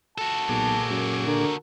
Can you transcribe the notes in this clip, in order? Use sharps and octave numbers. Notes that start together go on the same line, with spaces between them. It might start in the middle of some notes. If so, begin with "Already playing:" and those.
F#4 A4 A5
B1 A#2 G#4 D6
F#2
D3 A#4